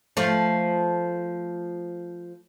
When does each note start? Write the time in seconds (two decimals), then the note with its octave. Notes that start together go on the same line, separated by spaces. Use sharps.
0.17 F3 A3